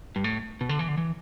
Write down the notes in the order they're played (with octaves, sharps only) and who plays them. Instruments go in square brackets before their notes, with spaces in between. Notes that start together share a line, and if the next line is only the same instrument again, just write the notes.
[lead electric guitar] G2
A2
B2
D3
E3
D3
E3